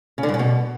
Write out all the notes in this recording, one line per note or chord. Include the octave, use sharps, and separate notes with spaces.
C#3
D3
G2
C#3
B2